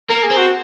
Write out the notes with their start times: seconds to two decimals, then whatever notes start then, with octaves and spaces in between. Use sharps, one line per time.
0.09 A#3 A#4
0.23 G#4
0.31 C4
0.37 F#4